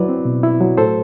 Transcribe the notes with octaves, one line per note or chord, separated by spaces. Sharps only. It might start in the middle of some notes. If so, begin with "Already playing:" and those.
Already playing: F#3 E4 B4 D5
C4
B2
E4
F#3
A2 A4 C5